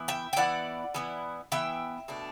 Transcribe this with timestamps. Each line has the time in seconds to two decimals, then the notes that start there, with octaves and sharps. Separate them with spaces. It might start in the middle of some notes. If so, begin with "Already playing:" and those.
Already playing: E3 B3 E4
0.08 E5 G5
0.33 G5
0.36 E3 B3 E4 D5 F#5
0.94 E3 B3 E4
1.52 E3 B3 E4 E5 G5
2.08 B2 A3 D4